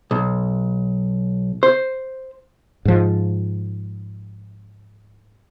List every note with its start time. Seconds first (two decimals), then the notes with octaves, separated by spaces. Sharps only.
0.11 B1
1.63 C5
2.85 G#2 F3